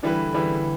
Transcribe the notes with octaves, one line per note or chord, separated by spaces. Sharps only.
D3 E3 G3 E4 B4
E3 G3 E4 B4